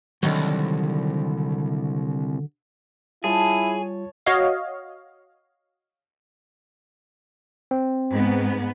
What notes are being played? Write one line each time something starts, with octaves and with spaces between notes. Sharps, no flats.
C2 D3 D#3 F#3
G3 E4 F4 G#4 C#5 A5
F#4 C#5 D#5 F5
C4
G#2 B3